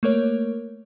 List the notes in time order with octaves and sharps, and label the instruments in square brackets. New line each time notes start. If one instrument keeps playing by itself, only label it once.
[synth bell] A3 A#3 A#4 C#5